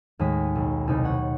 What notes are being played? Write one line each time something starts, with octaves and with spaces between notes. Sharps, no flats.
D#2 A2 G#3 D#6 B6
B1
C2 B2 D#4
C#5 F#5